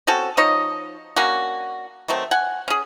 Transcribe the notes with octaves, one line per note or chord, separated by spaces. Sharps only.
C4 C#4 F#4 A4
F3 D#4 C#5 D#5
A#3 C#4 D4 F#4
D#3 F#3 A3 C4
F#5 G#5
C#4 G#4